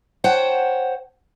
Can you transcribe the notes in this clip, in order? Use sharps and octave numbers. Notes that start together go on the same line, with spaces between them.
C5 C#5 F#5 G5 A5